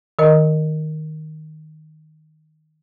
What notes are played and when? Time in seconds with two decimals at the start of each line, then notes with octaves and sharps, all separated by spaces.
0.19 D#3 A#4 D#5